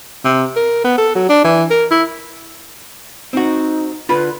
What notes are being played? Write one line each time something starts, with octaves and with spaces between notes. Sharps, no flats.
C3
A#4
B3
A4
F#3
D4
E3
A#4
E4
C4 D#4 F#4
D3 F4 B4 B5